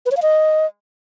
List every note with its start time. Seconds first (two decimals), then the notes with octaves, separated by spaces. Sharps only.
0.06 B4
0.11 C#5
0.17 F5
0.22 D#5